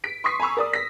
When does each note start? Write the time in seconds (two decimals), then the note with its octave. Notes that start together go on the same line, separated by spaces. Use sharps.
0.04 B6 D7
0.24 C6 C#6 D#6 B6 C7
0.40 G#5 A#5 B5 C#6 E6
0.57 A#4 D5 D#6
0.73 A#6 B6